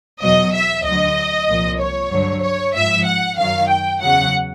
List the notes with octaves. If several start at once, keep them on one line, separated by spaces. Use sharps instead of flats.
E2 B2 F#3 D#5
E5
D2 D3 F#3 D#5
C2 A#2 F3
C#5
G2 D3 F#3
C#5
G#2 F3 E5
F#5
F#2 D#3 F#3 F5
G5
E2 C#3 F#3 F#5